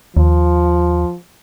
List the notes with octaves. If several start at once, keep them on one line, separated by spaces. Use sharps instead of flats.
D#2 F3